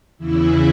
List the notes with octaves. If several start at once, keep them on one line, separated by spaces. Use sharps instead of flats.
E2 C#3 E3 E4